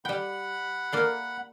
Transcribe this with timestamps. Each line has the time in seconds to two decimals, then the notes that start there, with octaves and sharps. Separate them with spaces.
0.05 G3 F#5 G5 B5
0.92 A#3 D5 F5